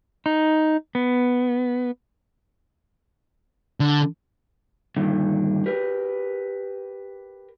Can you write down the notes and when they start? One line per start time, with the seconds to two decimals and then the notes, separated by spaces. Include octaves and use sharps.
0.26 D#4
0.95 B3
3.80 D3
4.97 G2 A#2 D3 D#3
5.66 G4 A#4 B4